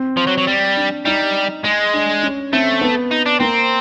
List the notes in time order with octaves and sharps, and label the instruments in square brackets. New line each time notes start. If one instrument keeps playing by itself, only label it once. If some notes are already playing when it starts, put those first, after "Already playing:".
Already playing: [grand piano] C4
[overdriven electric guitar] F3
F#3
F#3
G3
[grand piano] D4
[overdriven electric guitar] G3 [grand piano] D#4
[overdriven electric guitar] G#3
[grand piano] D4
C#4
[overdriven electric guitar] A3 [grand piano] C4
[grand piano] B3
[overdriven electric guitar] D#4
D4
[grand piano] A#3 [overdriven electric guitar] C4